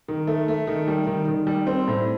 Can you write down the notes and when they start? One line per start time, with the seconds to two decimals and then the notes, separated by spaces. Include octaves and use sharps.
0.08 D#3
0.27 A3
0.48 A3
0.67 D#3
0.88 G3
1.07 D#3
1.28 D#3
1.47 G3
1.67 C4
1.87 A2